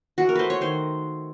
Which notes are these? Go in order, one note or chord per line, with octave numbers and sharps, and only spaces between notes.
E3 F#4
A#4
A3 B4 C5
C#5
D#3 C5